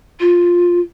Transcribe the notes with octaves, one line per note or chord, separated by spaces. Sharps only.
F4